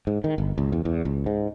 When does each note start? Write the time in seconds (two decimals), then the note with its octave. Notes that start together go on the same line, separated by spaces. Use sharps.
0.07 G#2
0.24 D#3
0.38 G1
0.58 C#2
0.72 E2
0.85 E2
1.05 C#2
1.26 G#2